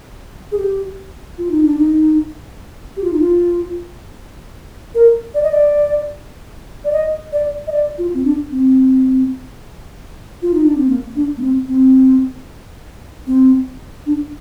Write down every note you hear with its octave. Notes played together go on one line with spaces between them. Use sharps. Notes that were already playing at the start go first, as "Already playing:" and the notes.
G#4
G4
F4
D#4
D4
D#4
G4
F4
D#4
F4
A#4
D5
D#5
D5
D5
D#5
D5
D#5
D5
F4
C4
D4
C4
F4
D#4
D4
C4
A#3
D4
A#3
C4
C4
C4
D4